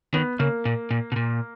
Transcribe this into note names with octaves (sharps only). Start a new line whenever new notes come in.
D#3 B3
C#3 A#3
A#2
A#2
B2
A#2